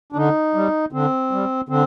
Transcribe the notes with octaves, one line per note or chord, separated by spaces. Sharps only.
D4
D3 D#4
G3
D3 C4
G3
D3 C4